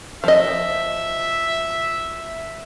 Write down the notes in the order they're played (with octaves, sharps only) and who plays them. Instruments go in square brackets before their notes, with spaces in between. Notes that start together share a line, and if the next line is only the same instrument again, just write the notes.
[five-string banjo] F3 D#5 [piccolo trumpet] E5